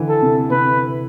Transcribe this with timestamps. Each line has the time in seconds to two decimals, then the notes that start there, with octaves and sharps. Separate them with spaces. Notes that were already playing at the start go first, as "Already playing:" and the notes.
Already playing: D3 E3
0.09 A4
0.22 C3
0.51 C3 B4